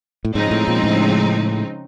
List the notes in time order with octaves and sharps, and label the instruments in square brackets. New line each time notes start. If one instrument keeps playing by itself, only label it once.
[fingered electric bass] A2
[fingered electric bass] G#2 [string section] C#3 F3 G#3 C4 D#4
[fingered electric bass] A2
A#2
A2